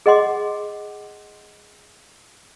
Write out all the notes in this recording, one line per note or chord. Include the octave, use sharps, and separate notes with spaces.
G#4 D#5 F#5 C6 D6